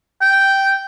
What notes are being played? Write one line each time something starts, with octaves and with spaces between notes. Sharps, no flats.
G5